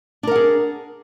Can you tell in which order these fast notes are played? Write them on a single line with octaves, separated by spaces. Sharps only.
D4 A#4 F#5 G#4